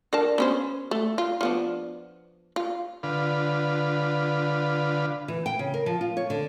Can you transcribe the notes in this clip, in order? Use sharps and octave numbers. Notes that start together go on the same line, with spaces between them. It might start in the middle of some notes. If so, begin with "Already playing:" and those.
D4 A#4 A5
B3 C#4 C5
A3
F4
F3 B3 D4
F4
D3 F4 B4
E3
G5
C#3
A#4
F3
F4
C#5
D3